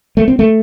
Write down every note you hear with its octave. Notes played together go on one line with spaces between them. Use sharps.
A3
C4
A3